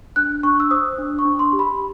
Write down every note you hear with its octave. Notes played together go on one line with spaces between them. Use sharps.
D4 F#6
D4 C#6
E6
C5 D#6
D4
C#6
D4
C6
G4
B5